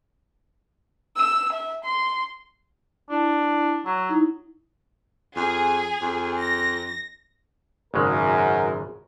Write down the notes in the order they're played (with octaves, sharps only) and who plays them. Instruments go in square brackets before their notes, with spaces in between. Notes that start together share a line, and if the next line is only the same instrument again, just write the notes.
[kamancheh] E6
E5
C6
[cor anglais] D4 [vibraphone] E4
[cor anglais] F#3 [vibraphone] E6
[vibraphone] D#4 E4
[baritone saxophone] F2 [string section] G#4
[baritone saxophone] F2
[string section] A#6
[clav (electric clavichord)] G#1 C#3 G#3 [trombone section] F#2 A#4